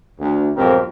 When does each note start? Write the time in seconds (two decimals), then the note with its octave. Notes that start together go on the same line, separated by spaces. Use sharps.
0.19 D2
0.56 B1 F2 G#2 C4 G4 A#4